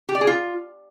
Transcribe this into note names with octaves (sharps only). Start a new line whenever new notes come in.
G4
D5
G#4
F4